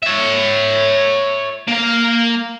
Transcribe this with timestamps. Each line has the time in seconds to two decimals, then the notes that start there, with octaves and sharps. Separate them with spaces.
0.03 C#5 E5
1.68 A#3 F5